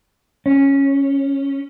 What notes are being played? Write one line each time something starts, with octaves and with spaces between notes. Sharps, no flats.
C#4